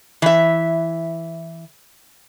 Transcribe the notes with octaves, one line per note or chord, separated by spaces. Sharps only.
E3 E5